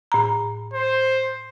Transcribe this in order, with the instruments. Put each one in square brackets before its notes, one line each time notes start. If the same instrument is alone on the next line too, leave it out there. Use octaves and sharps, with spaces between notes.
[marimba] A2 A#5
[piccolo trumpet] C5